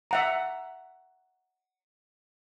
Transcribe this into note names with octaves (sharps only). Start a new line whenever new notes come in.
E5 F#5 A#5